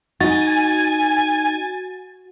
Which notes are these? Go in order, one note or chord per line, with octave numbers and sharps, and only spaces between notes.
D#4 F#4 G#5 A6